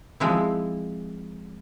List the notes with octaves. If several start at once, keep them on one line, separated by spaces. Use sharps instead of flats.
F3 G#3 C4 E4